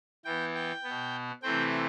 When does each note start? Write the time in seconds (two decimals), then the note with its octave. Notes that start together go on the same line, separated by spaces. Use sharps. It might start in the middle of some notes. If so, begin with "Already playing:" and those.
0.25 E3 B3 G5
0.54 G5
0.83 B3
0.89 B2
1.43 C3 E3 A3 C4 G5